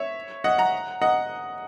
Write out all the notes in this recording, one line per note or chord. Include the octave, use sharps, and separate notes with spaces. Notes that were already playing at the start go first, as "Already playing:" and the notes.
Already playing: C#5 E5
D#5 F#5
F#5 A#5
D#5 F#5